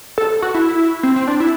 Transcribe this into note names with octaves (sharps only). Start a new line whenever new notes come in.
A4
F#4
E4
C4
C4
D4
E4